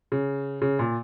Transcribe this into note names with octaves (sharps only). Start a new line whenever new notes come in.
C#3
C#3
A#2